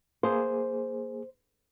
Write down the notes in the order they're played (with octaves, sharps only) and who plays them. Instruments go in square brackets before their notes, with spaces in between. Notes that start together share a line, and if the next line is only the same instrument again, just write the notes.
[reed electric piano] A#3 G#4 [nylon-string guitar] C5